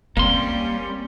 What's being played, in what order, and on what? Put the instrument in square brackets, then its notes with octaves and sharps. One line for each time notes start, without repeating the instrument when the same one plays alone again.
[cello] G3 C#4 [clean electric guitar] A#3 C6 [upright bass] C4